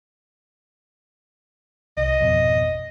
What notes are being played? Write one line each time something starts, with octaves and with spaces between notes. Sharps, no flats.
C2 D#5
G#1 F2 B2